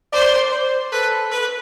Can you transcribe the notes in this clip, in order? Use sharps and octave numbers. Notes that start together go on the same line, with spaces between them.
C5 D5
C5
A4 B4
B4